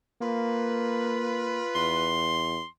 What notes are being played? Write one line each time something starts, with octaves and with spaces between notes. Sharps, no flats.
A#3 F4 B4
E2 C6